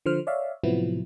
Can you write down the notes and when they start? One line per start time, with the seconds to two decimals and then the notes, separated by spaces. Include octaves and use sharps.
0.06 D3 F3 C5 F6
0.27 C#5 D5 E5 F5
0.63 A2 C3 F3 F#3 B3 E4